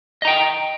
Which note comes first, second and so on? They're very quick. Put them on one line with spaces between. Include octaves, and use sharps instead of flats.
D#5 A#5 G5